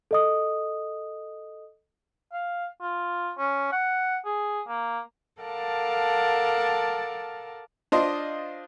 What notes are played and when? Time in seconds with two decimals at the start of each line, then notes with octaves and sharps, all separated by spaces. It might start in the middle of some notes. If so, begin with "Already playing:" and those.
0.11 A4 D#5 D#6
2.32 F5
2.81 F4
3.38 C#4
3.72 F#5
4.25 G#4
4.68 A#3
5.42 A4 A#4 D5 F5 F#5 A5
7.92 D4 F4 C5 D#5 C6